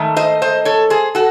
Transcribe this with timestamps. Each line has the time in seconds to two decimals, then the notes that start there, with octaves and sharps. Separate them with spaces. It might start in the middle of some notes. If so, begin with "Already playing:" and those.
Already playing: G#2 D#3 A3
0.16 C5 D#5
0.42 C5 D#5
0.65 A4 C#5
0.90 G#4 C5
1.15 F#4 A4